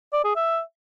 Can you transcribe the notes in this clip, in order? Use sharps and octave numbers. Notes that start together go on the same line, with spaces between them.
D5
G#4
E5